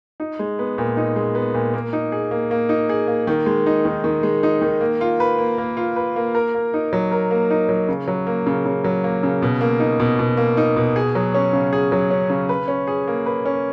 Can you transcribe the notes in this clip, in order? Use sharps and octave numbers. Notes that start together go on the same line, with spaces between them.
D#4
G#3
B3
A#2
D#4
G#3
B3
A#2
A#3
D#4
G#4
A#3
A#3
D#4
G#4
A#3
D#3
G#3
D#4
D#3
D#3
G#3
D#4
D#3
A#3
F4
B4
A#3
A#3
F4
B4
A#3
A#4
A#3
D#4
F#3
A#4
A#3
D#4
F#3
C#3
F#3
A#3
C#3
C#3
F#3
A#3
C#3
B2
A#3
D#4
B2
B2
A#3
D#4
B2
G#4
F#3
C#4
C#3
G#4
F#3
C#4
C#3
B4
C#4
G#4
A#3
B4
C#4